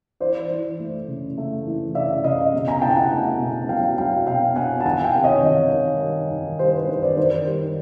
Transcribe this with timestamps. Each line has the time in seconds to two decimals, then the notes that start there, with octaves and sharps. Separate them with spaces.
0.20 E3 C5 D5
0.50 E3
0.80 A3
1.08 C#3
1.38 A3
1.67 E3
1.95 C#3 D5 E5
2.24 C#3 D#5 F5
2.54 B2
2.67 G#5 A#5
2.82 B2 G5 A5
2.96 F#5 G#5
3.11 A3
3.40 B2
3.69 F#3 F5 G5
3.98 F#3 F5 G5
4.27 B2 F5 G5
4.56 B2 F#5 G#5
4.81 A5
4.85 D#3 F#5 G#5
5.04 F5 G5
5.15 C3
5.24 C#5 D#5
5.43 D#3
5.72 D#3
6.01 G3
6.31 D#3
6.59 G3 C5
6.74 B4
6.89 D#3 C5
7.02 C5 D5
7.17 D#3 C5
7.46 G3